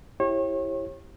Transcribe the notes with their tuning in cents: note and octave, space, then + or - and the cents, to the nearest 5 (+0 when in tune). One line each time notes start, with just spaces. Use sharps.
E4 +0 G4 +0 C#5 -35